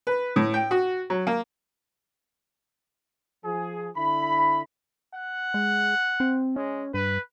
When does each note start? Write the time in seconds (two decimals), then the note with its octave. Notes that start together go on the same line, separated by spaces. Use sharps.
0.07 B4
0.36 A2
0.54 G5
0.71 F#4
1.10 F#3
1.27 A#3
3.45 F3 G#4
3.95 D3 E4 B5
5.14 F#5
5.54 G#3
6.20 C4
6.56 G#3 C#4
6.94 G2 B4